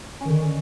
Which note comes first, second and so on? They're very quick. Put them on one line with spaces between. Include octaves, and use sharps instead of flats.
C#4 D#3 D3